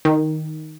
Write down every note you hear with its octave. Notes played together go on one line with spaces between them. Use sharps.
D#3